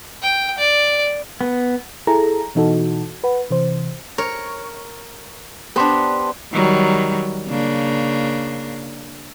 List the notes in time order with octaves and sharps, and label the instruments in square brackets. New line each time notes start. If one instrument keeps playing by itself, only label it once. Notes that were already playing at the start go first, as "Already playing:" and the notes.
[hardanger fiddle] G5
D5
[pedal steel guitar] B3
[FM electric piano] E4 G#4 A4 A#5
B2 E3 D#4 F#4 A4
B4 F#5
C3 E3 C5
[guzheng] A#4 C#5
[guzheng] B3 D4 [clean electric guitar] G4 C5
[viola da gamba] D#3 F#3 G3
C#3 A#3 D4